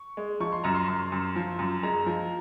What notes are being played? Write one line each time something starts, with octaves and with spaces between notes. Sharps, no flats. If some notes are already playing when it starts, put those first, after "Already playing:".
Already playing: C#6
G#3
F3 C#6
C6
F#2 A#5
C6
F#2
F#2
F3
F#2
G#3 A#5
F3